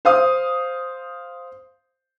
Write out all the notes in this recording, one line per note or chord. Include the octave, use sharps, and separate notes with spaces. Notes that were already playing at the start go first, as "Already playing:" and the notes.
C5 F5 D#6